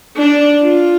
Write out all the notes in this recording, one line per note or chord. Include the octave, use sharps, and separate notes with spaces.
D4
F4